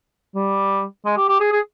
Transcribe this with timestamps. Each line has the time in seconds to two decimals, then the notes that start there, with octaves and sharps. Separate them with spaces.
0.35 G3
1.05 G#3
1.17 G4
1.29 G4
1.40 G#4
1.52 G#4